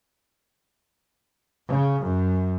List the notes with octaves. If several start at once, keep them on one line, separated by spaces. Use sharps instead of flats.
C#3
F#2